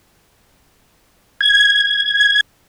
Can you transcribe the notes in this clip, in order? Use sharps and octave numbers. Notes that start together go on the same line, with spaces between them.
G#6